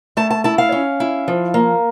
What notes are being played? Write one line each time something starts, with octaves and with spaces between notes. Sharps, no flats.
A3 A5
A5
E4 A5
F5
C#4
E4
F3
A#3